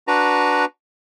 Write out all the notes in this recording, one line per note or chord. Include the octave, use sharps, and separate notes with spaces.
D4 F#4 B4 A#5